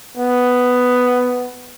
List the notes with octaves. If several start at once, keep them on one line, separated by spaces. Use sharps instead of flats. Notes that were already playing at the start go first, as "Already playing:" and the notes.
B3